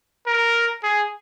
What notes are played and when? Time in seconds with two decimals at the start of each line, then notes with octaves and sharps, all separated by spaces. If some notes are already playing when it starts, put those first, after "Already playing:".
0.26 A#4
0.83 G#4